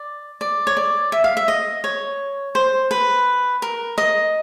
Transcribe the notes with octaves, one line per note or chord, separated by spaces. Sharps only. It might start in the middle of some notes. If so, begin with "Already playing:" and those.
Already playing: D5
D5
C#5
D5
E5
F5
E5
D#5
C#5
C5
B4
A#4
D#5